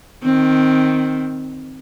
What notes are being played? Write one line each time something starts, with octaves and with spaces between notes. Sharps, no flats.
D#3 C4